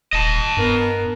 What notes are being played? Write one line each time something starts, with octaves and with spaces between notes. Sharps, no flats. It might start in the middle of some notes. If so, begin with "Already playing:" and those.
D#1 D#5 A5
G2 B3 A#4